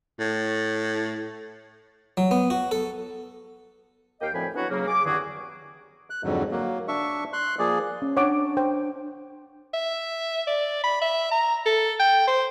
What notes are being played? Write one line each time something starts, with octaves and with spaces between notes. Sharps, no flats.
A2
F#3
B3
F#4
A4
D#2 A#3 D#5 F5 G5
D2 A2 F3 C4 G#5 B5
F#3 B3 D4 E4 F#4 C#5
C#3 F#3 A#3
G#4 D6
E2 G2 D3 D#3 F#4 G#4
F#6
F2 G#2 D3 F#3
F#3 A#3
D4 E5 C#6
C6 F#6
F3 A#3 G#4 D5
C#4
D4 C#5 F#5 D6
C5 G5
E5
D5
B5
E5
A#5
A4
G5
C5